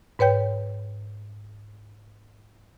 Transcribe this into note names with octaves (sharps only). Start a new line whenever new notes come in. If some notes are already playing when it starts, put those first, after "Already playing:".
G#2 B4 C#5 G5 G6